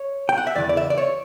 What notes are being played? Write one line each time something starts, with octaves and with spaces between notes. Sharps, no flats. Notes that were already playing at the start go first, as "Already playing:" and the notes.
Already playing: C#5
G5
F#5
E5
E2 C#3 E3 D5
D5
E5
D5
C#5